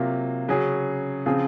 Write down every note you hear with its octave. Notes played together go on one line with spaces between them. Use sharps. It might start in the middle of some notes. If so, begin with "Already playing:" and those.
Already playing: C3 F#3 A#3 F4
C#3 F#3 C#4 G#4
C#3 F3 C4 F4 G#4